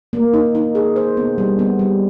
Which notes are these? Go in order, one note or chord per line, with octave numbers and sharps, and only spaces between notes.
A#3
D#4
D#4
G#4
C5
B3
G3
B3
G3